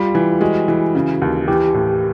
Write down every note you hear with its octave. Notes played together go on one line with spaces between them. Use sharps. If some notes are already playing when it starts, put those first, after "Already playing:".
Already playing: G3 F4
E3
G#3 F#4
E3
C#3
D#2
E3 G4
A2